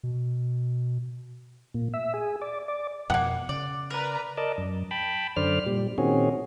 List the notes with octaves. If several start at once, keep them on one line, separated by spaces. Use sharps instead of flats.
B2
A#2
E5
G#4
D5
D5
F2 B2 A#3 B3 F#5
C#3 D5
A#4 B4 D5 A#5
A#4 D5 D#5 A5
F#2
G5 A5 B5
F#2 D3 C5 D5 F6
A#2 G3
A#2 D#3 C4 C#4 F#4 G#4